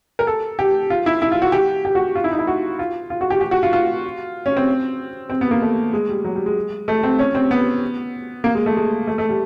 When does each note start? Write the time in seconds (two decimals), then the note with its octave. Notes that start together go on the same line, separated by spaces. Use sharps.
0.19 A#4
0.27 A4
0.59 G4
0.90 F4
1.06 E4
1.22 E4
1.32 F4
1.42 F#4
1.52 G4
1.85 G4
1.95 F#4
2.15 F4
2.24 E4
2.31 D#4
2.39 E4
2.47 F#4
2.79 F4
3.10 F4
3.21 F#4
3.30 G4
3.41 G4
3.51 F#4
3.63 F4
3.73 F4
4.46 C#4
4.56 C4
5.30 C4
5.41 B3
5.51 A#3
5.62 A3
5.93 G#3
6.09 G3
6.25 F#3
6.36 G3
6.46 G#3
6.88 A3
7.03 C4
7.19 C#4
7.35 C4
7.51 B3
8.44 A#3
8.55 G#3
8.66 A3
8.77 G#3
9.07 A3
9.18 A3
9.29 G3